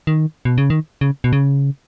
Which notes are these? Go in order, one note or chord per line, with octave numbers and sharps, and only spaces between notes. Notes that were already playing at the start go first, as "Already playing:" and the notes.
D#3
B2
C#3
D#3
C#3
B2
C#3